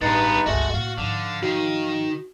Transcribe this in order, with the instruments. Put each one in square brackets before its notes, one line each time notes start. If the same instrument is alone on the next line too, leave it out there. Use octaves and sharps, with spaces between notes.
[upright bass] A1 [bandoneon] G2 D#4 B4 [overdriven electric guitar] G#3 B3 [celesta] A6 C#7
[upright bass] G1 C#2 [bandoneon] G#3 A3 [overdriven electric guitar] F#4 F#5
[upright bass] A2 A#3 [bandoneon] F5
[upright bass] G#2 F3 [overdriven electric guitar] D3
[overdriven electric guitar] D#3 [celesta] F#4